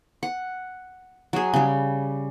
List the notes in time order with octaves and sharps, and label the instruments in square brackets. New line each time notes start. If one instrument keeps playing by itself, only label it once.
[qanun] F#5
F#3 G#4
C#3 G3